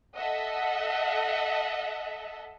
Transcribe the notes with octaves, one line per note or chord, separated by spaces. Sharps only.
A4 D#5 E5 F#5